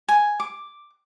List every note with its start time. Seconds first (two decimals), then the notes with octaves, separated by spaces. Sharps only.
0.08 G#5
0.40 D6